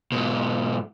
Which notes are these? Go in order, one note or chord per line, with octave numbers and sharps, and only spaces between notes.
G#2 B2